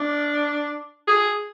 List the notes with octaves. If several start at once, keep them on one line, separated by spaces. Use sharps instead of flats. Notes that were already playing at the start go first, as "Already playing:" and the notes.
Already playing: D4
G#4